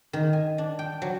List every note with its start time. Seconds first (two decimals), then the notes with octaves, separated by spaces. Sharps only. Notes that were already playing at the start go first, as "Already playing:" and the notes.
0.13 D#3
0.33 G#5
0.58 D4
0.79 G5
1.02 F#3